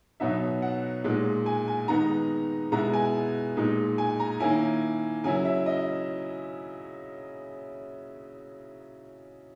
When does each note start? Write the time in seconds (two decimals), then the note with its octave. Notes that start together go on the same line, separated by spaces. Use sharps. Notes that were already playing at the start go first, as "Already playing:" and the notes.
0.20 B2 F#3 B3 D#4 E5
0.62 F#5
1.04 A#2 G#3 D#4
1.46 G#5
1.68 G#5
1.88 D#3 G#3 B3 D#4 A#5
2.72 B2 G#3 B3 E4 A#5
2.93 G#5
3.57 A#2 G#3 D#4
3.98 G#5
4.20 A#5
4.40 D#3 A#3 C#4 E4 G#5
5.24 C#3 F#3 C#4 E4 G#5
5.45 E5
5.66 D#5